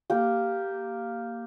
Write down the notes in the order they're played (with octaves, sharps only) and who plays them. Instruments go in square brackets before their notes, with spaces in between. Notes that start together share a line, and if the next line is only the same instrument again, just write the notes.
[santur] A#3 G4